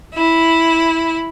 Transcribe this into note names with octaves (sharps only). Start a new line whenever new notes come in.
E4